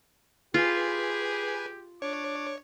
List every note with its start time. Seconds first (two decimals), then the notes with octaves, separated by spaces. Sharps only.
0.54 F4 G4 G#4 B4 G#5
2.02 D4 C#5 D6